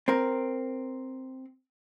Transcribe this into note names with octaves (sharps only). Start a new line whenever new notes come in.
C4 A#4